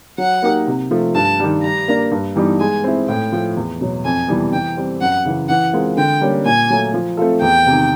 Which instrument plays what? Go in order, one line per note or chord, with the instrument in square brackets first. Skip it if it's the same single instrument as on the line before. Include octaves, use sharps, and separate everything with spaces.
[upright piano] F#3 [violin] F#5
[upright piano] A#3 D#4 G4 A#4
C3
F3 A3
[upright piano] G2 [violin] A5
[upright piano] D#3 G3
[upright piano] G3 [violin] A#5
[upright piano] A#3 D4
G2
E3 G3 B3 D#4
[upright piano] G#3 [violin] G#5
[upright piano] C4 E4
[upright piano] A2 [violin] G5
[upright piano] F3 A3
E2
B2 F#3
[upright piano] F2 [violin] G#5
[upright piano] C3 E3 G3 B3
[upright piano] E3 [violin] G5
[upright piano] G3 C4
[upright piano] F#2 [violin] F#5
[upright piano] C#3 E3
[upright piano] E3 [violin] F#5
[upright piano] G#3 C4 F4 A#4
[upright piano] D3 [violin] G5
[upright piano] G3 A#3 C#4
[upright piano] A#2 [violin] G#5
[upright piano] F#3 A3
F3
A3 C4 F4 A4
[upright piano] E2 [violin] G5
[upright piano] C3 D#3